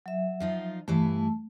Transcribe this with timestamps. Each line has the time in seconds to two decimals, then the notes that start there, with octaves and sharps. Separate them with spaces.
0.06 F#3 E5
0.40 F3 D#4 F4
0.88 G2 E3 A3 E4 A5